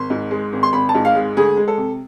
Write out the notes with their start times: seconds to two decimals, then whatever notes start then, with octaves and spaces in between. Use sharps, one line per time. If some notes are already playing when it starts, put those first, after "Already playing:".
Already playing: G#1 C6
0.10 G#2
0.31 G#3
0.53 G#1
0.63 C6
0.73 G#1 B5
0.89 A5
0.95 G#2
1.05 F5
1.15 G#3
1.37 D2 G#4
1.57 G#3
1.68 A4
1.78 C3